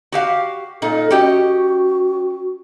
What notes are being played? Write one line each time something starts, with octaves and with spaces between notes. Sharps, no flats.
F#4 G4 F5
A#2 D#4 A4
C#4 F#4 G4 D#5